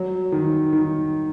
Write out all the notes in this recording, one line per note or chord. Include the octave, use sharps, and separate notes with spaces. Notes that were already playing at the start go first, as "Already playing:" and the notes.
Already playing: F#3
D#3
D#3